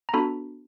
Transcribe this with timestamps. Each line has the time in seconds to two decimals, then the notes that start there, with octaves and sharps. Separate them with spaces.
0.09 A#5
0.14 B3 D4 F#4 A4 B5